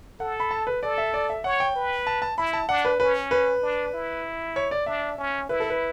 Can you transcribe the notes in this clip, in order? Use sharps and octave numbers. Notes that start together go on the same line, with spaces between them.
A4 F#5
B5
A5
B4
A4 D5
E5
D5
E5
C#5 F#5
G5
B4
A5
A5
E4 B5
A5
D4 F#5
B4
C#4 B4
B4
D4
E4
C#5
D5
D4 E5
C#4
E4 B4
A4
B4